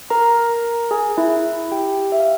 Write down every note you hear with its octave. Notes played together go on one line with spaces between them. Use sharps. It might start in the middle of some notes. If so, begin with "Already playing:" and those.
A#4 A#5
G#4 G#5
E4 E5
G4 G5
E5
F5